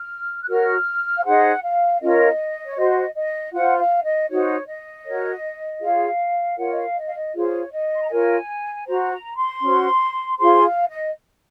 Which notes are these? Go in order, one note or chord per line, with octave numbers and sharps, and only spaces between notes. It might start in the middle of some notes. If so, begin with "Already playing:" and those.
Already playing: F6
F#6
F#4 A#4 C#5 F6
F5
D#4 G#4 C5 F#5
F5
C#4 F4 A#4 C#5 D#5
C#5
F#4 C5 D#5
D#5
F4 C5 F#5
F5
D#5
D#4 F#4 C5 C#5
D#5
F#4 A#4 C#5
F4 G#4 C#5 F5
F4 A#4 C#5 F#5
D#5
F5
D#5
F5
D#5
F4 G#4 C5 C#5
D#5
C6
A#5
F4 A#4 C#5 G#5
F#4 C5 A#5
A#5
C6
C#4 F#4 C5
F4 G#4 C5 C6
F5
D#5